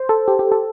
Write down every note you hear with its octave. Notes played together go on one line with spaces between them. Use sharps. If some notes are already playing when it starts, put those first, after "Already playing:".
Already playing: C5
A4
G4
G4
A4